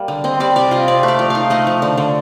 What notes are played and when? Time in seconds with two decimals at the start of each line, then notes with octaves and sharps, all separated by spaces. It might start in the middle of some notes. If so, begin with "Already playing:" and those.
Already playing: G3 A#3
0.08 D3
0.24 C4 D#5
0.40 G3 D5
0.56 C3 D5
0.71 F4 D#5
0.88 C4 D5
1.03 A3
1.08 D5
1.19 F3
1.30 D#4 F5
1.50 A3 D#5
1.67 F3
1.82 D3
1.98 D3